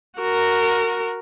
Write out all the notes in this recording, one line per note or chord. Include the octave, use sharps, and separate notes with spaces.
F#4 A#4